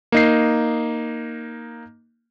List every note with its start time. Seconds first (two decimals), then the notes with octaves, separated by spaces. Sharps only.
0.12 A#3 D#4 C7